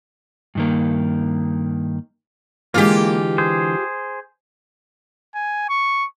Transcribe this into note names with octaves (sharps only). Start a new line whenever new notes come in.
G2 D#3 A#3
D3 E3 G#3 A#3 F4 G4
G#4 C5
G#5
C#6